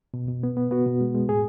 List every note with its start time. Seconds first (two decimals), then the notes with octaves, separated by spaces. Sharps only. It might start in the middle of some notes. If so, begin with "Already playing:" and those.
0.14 B2
0.29 B2
0.43 B3
0.57 B3
0.71 B3 F#4
0.86 B2
1.01 G#3
1.15 G#3
1.28 A2 G#4